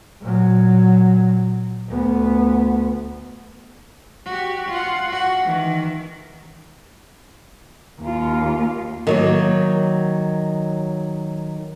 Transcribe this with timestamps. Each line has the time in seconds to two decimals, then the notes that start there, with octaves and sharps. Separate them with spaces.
0.21 A#2 F#3
1.89 D2 B3
4.26 F#4 G4
4.68 F4 F#5
5.08 F#4 F#5
5.42 D#3 E3
8.01 D#2 F4
9.07 D#3 F#3 A#3